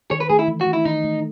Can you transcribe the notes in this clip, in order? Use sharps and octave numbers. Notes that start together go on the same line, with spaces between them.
D#3 C#5
B4
A3 G#4
E4
E3
F#4
A3
E4
D#3 D#4
A3